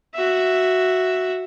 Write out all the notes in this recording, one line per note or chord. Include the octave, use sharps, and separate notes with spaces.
F#4 E5